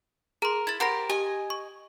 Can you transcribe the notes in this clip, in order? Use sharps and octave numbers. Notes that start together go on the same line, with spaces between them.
G#4 A#4 C6
E4 G#6 A6
G4 A#4 C5 F#5 B5 A#6
G4 D#5 G#5
C#6